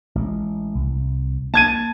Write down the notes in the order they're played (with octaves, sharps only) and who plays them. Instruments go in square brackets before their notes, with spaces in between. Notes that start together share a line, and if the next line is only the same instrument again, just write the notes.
[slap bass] A1 G#3
C2
[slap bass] A#3 [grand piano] A5 G#6 D#7